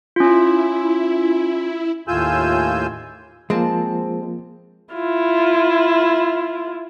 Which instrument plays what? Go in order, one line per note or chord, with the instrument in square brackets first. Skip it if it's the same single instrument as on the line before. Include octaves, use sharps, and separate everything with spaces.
[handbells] C#4 F4 [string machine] E4
[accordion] D#2 A2 F4 G#5 E6 G6
[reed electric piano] F3 A#3 F4 [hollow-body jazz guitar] G#3 [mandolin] C4 A5
[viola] E4 F4